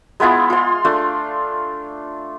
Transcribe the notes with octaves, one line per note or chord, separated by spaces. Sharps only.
G#3 B3 E4 F4
F4 C6
A3 D4 F4